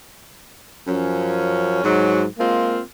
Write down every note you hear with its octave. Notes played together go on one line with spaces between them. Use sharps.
F#2 F3 C#4
G#2 F#3
G#3 A#3 C4 F4